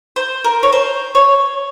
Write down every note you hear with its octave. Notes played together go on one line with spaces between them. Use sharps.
C5
A#4
C#5
C5
C#5